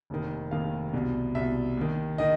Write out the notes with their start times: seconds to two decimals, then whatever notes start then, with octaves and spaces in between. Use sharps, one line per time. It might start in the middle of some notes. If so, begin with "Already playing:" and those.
0.10 F1 D#2 D#3
0.51 F1 D#2 D#3 F5
0.93 C2 B2
1.35 C2 B2 E5
1.77 D#2 D#3
2.18 D#3 D#5